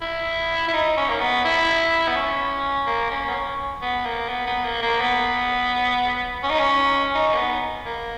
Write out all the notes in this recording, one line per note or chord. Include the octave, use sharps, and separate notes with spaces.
E4
E4
D#4
C#4
A#3
B3
E4
B3
C#4
A#3
C#4
B3
C#4
B3
A#3
B3
B3
A#3
A#3
B3
C#4
D#4
C#4
D#4
A#3
B3
A#3